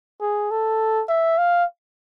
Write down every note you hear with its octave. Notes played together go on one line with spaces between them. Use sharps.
G#4
A4
E5
F5